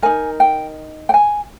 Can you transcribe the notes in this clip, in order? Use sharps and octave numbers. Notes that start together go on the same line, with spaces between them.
D#4 A#4 G#5
G5
G5
G#5